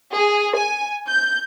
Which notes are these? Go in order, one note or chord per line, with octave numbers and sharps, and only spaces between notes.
G#4
G#5
G6